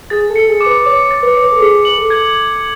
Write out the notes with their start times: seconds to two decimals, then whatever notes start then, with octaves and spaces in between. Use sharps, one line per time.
0.10 G#4 A6
0.30 A4
0.36 C#7
0.49 G#4
0.61 D6
0.66 B4
0.86 C#5 D6
1.11 A6
1.23 B4
1.35 C#5 C#7
1.45 B4
1.52 A4
1.60 G#4 C#7
1.85 B4 F#7
1.98 A4
2.10 G#6